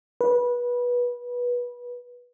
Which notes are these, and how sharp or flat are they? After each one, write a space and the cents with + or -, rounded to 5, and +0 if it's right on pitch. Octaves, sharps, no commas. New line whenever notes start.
B4 -20